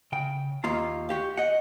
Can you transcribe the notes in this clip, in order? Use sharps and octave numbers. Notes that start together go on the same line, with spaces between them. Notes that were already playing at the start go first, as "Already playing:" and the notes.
C#3 G5
D#2 A#3 F4 A#5
F#4 G4 F5
D#5 F#5